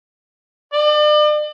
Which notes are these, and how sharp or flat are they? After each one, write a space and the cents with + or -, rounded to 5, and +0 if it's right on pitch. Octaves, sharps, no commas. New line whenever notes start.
D5 +40